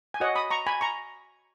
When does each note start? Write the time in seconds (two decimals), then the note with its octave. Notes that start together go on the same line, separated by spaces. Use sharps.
0.14 G#5
0.20 F#4 C#5 D#5 F#5
0.35 B5 D#6
0.50 A#5 C#6
0.67 G#5 B5
0.81 A#5 C#6